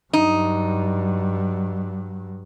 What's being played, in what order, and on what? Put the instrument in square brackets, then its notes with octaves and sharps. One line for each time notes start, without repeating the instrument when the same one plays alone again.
[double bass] G2 F#3 [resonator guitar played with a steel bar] D#4